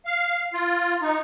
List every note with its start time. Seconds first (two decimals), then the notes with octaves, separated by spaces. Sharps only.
0.06 F5
0.54 F4
1.02 D#4